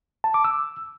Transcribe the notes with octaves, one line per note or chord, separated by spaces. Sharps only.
A5
D6
E6